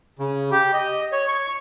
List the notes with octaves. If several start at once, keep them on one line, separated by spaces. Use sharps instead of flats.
C#3
G4
D#5
C#5
C#6